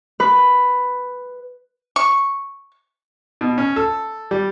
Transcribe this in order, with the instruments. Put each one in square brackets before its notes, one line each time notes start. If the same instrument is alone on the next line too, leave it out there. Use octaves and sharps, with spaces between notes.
[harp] B4
[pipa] C#6
[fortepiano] B2
C#4
A4
G3